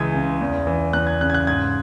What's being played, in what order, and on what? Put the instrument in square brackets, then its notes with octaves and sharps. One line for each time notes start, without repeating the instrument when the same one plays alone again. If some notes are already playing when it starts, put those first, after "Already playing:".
Already playing: [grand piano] C#2 E3 G#3 G#6
C#3
E2
E3
E2 F#6
G#6
C#3 F#6
G#6
F#6
G#2 G#6